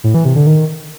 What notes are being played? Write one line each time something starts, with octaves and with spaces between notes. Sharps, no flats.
A2
E3
C3
D3
D#3